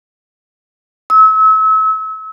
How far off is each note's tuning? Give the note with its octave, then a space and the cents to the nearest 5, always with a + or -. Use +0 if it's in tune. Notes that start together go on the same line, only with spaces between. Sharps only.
E6 -35